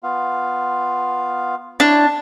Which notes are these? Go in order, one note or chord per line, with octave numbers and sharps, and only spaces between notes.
B3 F4 F5
D4 E4 C#5 A5